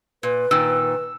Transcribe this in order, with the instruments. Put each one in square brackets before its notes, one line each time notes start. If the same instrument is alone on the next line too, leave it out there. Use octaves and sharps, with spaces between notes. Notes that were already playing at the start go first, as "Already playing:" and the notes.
[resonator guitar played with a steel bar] A#2 [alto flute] B4
[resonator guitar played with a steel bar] A#2 D#3 [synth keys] E6